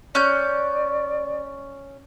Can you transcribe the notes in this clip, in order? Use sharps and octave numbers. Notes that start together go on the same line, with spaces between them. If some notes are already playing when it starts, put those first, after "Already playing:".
C#4 D5 F#6 G6